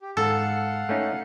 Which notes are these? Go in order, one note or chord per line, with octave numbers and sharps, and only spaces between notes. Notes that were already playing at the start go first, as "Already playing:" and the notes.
G4
G#2 A4 F5 F#5
A3 C#4 D#4